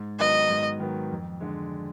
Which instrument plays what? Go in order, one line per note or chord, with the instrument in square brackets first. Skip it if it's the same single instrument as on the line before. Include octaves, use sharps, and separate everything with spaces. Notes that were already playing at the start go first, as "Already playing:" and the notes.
Already playing: [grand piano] G#2
[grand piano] D#3 F#3 B3 [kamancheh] D#5
[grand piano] G#2
D#3 F#3 B3
F2
D3 G#3